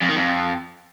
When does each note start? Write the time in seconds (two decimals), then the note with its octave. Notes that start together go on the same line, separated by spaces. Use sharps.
0.01 F2
0.09 D#3
0.16 F2